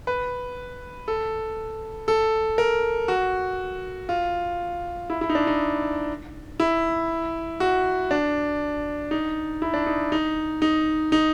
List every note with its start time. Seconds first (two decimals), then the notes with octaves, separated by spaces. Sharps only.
0.07 B4
1.08 A4
2.08 A4
2.58 A#4
3.08 F#4
4.09 F4
5.10 E4
5.21 E4
5.30 D#4
5.35 D4
5.47 D#4
6.60 E4
7.60 F#4
8.11 D4
9.11 D#4
9.62 E4
9.74 D4
9.86 D#4
10.12 D#4
10.62 D#4
11.12 D#4